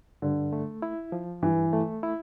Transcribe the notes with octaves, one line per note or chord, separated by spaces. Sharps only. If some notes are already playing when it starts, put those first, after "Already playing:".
G2 D3
A3
E4
F3
G2 E3
A3
E4